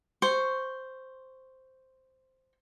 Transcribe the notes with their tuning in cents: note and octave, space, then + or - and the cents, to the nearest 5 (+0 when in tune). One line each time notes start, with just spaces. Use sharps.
C5 +0 C#6 +0